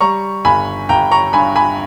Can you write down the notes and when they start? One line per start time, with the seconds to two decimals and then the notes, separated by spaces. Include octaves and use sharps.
0.01 G3 A#5 C#6
0.45 G1 G#5 B5
0.89 G1 G5 A#5
1.11 A#5 C#6
1.33 G2 G#5 B5
1.56 G#5 B5